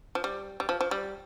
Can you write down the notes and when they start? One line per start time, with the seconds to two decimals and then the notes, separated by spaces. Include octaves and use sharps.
0.15 F3
0.24 G3
0.60 G3
0.69 F3
0.81 F3
0.91 G3